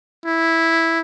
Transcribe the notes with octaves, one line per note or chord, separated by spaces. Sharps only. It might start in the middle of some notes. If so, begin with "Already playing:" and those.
E4